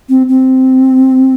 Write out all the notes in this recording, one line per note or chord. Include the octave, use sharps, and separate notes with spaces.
C4
C4